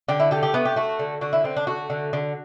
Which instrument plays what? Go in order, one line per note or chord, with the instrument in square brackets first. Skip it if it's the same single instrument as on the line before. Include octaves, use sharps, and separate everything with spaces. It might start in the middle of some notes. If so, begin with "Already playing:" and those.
[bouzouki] D3 G4
E4
A3 G4
G4
A3 B3
G4
A3 F#4
D3
D3 F#4
E4
D3 C4
D4
A3 F#4
D3
D3